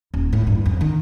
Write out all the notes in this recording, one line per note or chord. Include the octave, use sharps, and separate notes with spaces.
D#1
A2
G2
F2
D#3